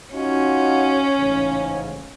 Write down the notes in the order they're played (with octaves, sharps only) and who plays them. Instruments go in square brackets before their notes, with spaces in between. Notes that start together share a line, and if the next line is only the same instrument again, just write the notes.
[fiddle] C#4 [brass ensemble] D#4 F4 F#4
[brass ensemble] A1 G#2 C#3